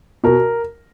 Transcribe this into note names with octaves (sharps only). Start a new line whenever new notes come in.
B2 A#4